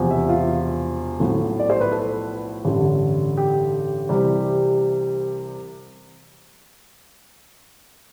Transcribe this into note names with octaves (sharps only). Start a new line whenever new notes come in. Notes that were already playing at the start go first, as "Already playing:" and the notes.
Already playing: E1 E2 C3 F3
E5
F4
B1 A2 F3
D5
C5
B4
A4
A1 G2 D3
G4
C2 C3 E3 G3